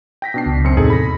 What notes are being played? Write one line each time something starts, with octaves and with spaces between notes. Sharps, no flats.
G5 A#6 B6
B2 D4 C7
C#2
F#2 C4 C#7
E2 A2 C3 D#4 G#4 A4
B5 A#6